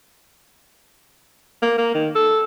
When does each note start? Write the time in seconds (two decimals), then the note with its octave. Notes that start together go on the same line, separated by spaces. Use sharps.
1.62 A#3
1.78 A#3
1.95 D#3
2.15 A4